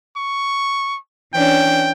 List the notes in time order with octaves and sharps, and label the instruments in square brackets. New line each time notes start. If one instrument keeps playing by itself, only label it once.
[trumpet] C#6
[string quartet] E3 C#4 D4 [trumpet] G5